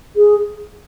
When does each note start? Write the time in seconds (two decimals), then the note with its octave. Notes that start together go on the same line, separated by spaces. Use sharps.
0.16 G#4